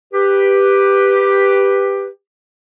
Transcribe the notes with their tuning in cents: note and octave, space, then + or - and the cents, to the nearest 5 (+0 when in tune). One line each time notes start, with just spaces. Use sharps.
G4 +5 B4 +0